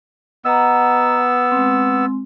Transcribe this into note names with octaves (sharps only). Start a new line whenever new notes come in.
B3 D#5 F#5 A#5 E6
G#3 C4